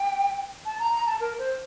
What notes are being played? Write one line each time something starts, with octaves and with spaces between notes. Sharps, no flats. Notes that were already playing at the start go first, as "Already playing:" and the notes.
Already playing: G5
A5
A#5
A#5
A5
A#4
C5